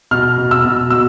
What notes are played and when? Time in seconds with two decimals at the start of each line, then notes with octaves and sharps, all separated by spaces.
0.11 B2 F6
0.38 B2
0.51 E6
0.65 B2
0.90 B2 E6